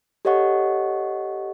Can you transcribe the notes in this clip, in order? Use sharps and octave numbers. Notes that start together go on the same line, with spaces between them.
G4 A4 C#5 D#5 F#5 C#6